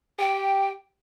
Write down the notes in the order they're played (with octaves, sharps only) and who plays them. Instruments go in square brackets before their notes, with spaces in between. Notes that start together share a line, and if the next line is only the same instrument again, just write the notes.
[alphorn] G4 [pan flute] G5